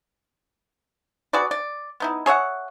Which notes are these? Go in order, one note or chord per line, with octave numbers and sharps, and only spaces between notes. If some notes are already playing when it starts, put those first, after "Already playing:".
F#4 G#4 B4 D5
D5
B3 D#4 E4
G#4 C#5 E5 F#5